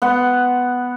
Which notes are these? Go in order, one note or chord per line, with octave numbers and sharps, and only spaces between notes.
B3 F#5 C6